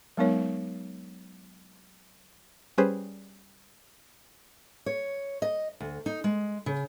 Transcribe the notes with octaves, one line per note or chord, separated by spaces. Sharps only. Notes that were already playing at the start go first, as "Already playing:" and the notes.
F#3 G#3 B3 D#4 A#4 C#5
G3 C#4 G#4 B4 C5
C#5
D#5
D2
D#4
G#3
C#3